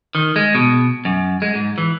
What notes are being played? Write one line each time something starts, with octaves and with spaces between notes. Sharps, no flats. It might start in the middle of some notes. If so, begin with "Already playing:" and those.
D#3
G#3
B2
F#2
G#3
G#2
E3